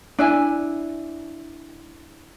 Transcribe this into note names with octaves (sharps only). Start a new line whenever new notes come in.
D4 E4 G#5